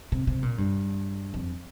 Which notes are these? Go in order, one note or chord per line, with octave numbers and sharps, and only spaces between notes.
C3
C3
A#2
G2
F2